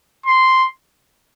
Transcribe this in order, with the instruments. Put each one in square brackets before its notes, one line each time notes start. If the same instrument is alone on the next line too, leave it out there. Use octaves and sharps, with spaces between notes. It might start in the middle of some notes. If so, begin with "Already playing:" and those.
[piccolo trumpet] C6